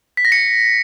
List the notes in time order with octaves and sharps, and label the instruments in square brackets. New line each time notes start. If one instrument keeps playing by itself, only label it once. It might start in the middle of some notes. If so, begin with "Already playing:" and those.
[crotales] B6
A#6
C#7